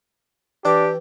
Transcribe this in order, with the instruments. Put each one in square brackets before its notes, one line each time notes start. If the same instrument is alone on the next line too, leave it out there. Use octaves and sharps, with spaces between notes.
[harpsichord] E3 D5 [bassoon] D4 [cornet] G4